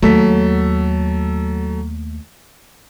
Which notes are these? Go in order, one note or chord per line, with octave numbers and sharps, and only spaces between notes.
D#2 F#3 A3 A4 B6